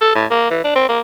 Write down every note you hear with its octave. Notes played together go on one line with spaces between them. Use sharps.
A4
A2
A#3
E3
D4
C4
A#3